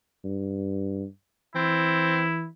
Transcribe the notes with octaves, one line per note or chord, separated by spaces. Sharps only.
G2
E3 C4 E4